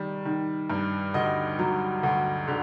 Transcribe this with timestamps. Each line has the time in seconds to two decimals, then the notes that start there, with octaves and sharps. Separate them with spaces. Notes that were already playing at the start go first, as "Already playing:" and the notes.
Already playing: D#3 G3
0.25 D#3
0.70 G2
1.14 D2 D#5
1.59 F#3
2.03 D2
2.48 D3